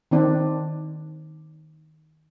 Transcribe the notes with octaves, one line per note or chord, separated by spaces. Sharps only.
D#3 C4 D4